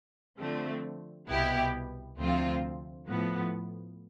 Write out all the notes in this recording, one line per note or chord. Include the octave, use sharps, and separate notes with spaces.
D3 F3 A3 C4
C2 B2 B3 E4 G4
D2 C3 F3 C4 F4
A2 F3 B3